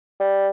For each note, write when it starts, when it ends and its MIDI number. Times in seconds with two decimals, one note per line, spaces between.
0.20 0.49 55